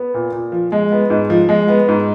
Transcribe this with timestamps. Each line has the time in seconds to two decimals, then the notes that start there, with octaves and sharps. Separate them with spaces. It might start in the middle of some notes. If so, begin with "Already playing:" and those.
Already playing: B3
0.14 A#2
0.32 A#2
0.52 F3
0.72 G#3
0.92 B3
1.10 G#2
1.30 F3
1.49 G#3
1.68 B3
1.88 G#2